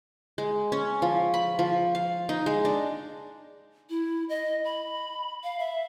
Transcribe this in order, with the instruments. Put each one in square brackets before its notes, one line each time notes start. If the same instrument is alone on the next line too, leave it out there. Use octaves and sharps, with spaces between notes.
[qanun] G#3
C#4
F3
B5
F3
F5
D#4
G#3
D4
[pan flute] E4
D#5
B5
F5
E5